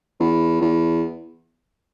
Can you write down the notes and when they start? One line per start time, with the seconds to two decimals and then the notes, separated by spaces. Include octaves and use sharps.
0.20 E2
0.61 E2